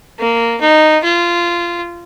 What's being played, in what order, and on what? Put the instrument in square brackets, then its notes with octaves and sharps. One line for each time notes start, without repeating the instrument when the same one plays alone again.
[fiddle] A#3
D#4
F4